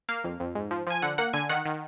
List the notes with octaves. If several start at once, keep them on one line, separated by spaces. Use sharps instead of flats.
A#3 F5
F2
F2
G#2
F3
F3 G#5
D3 F#5
A#3 F#5
D3 G#5
D#3 F#5
D#3